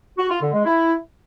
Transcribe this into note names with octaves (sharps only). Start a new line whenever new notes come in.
F#4
F4
D3
G#3
E4